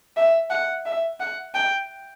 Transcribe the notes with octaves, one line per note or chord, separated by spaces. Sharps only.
E5
F#5
E5
F#5
G5